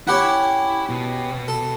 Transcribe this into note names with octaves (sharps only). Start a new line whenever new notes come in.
C#4 E4 G4 F#5 B5
B2
A4